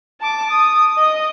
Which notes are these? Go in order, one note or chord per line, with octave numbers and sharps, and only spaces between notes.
A5 D6
D#6
D#5